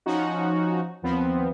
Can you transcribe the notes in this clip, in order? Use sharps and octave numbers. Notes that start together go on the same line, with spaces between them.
F3 C#4 D#4 F#4
D#2 F3 B3 C4